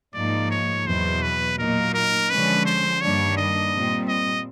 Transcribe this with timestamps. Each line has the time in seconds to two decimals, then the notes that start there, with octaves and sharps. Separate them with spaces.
0.14 G#2 F3 A#3 D#4 D5
0.51 C#5
0.86 E2 B2 F#3 C5
1.22 B4
1.58 A#2 F#3 A#3 D#4 A#4
1.94 A#4
2.29 D3 F3 G#3 C#4 B4
2.66 C5
3.01 G2 D#3 G3 A#3 D4 C#5
3.37 D#5
3.73 A#2 G3 C4
4.09 D#5